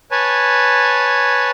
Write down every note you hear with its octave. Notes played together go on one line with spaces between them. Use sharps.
B4 C#5 G#5 A5